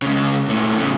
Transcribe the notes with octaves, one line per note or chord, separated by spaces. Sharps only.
C#2 C#3
A#2 A3
A2 C#3